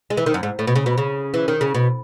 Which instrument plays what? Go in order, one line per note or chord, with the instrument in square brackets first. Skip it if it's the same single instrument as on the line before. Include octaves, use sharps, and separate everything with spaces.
[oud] G#3
E3
D#3
F#2
G#2
A2
B2
C#3
B2
C#3
E3
D#3
C#3
B2